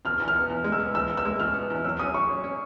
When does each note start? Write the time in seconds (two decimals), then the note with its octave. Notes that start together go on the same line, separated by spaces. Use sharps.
0.05 B2 F6
0.20 E2
0.28 F6
0.34 B3
0.50 E2
0.64 G#3
0.72 E6
0.79 B3
0.94 E2 E6
1.09 B3
1.17 E6
1.25 G#3
1.40 B2 F6
1.54 B3
1.70 E2
1.84 F#3 E6
1.99 C#4 D#6
2.14 F#3 C#6
2.30 C#4
2.44 C#4